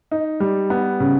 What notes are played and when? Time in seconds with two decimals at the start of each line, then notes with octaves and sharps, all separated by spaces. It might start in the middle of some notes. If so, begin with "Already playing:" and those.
0.11 D#4
0.40 G3
0.70 B3
1.00 C#3